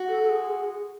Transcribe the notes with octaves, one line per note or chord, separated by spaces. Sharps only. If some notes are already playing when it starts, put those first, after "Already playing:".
Already playing: F#4
A4
A4
G#4